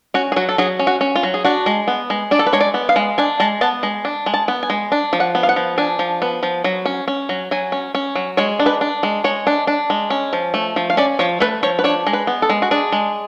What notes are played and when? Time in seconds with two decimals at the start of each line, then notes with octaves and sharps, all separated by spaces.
0.14 C#4 F#4
0.32 G#4
0.36 F#3 F#4
0.49 A4
0.58 F#3 G#4
0.79 C#4
0.87 F#4
1.01 C#4
1.16 F4
1.23 F#3
1.34 G#4
1.44 D4 F#4
1.66 G#3
1.88 B3
2.10 G#3
2.31 D4 D5
2.39 A4
2.46 B4
2.53 G#3 C#5
2.61 D5
2.74 B3
2.89 F5
2.96 G#3
3.18 D4 G#5
3.40 G#3 A5
3.61 B3 A5
3.83 G#3
4.05 D4
4.26 G#3
4.34 A5
4.48 B3
4.63 G#5
4.70 G#3
4.92 D4
5.13 F3
5.20 F#5
5.35 B3
5.43 F5
5.49 F#5
5.56 F3
5.78 D4 G#5
5.99 F3
6.22 B3
6.43 F3
6.64 F#3
6.86 C#4
7.08 C#4
7.29 F#3
7.51 F#3 G#5
7.72 C#4
7.95 C#4
8.15 F#3
8.37 G#3 C#5
8.59 D4
8.66 B4
8.81 D4
9.03 G#3
9.24 G#3 C#5
9.47 D4
9.67 D4
9.90 G#3
10.10 C#4
10.33 F3
10.54 A3
10.76 F3
10.90 F5
10.97 C#4 D5
11.19 F3 C#5
11.40 A3 B4
11.63 F3 C#5
11.79 B4
11.84 D4 C#5
12.07 G#3
12.13 B4
12.27 B3
12.42 A4
12.49 G#3
12.62 F#4
12.71 D4 G#4
12.92 G#3